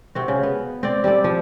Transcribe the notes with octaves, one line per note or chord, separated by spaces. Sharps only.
C3 C4 F#4
C#3
B3
C4 D5
G3 G4 A4 D5
F3